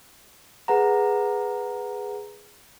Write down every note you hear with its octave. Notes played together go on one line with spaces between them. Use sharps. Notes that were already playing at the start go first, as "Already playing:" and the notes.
G#4 B4 F#5 A#5